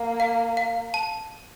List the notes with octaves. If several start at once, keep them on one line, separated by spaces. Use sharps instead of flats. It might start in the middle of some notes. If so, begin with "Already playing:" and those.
Already playing: A#3
F5
F5
A5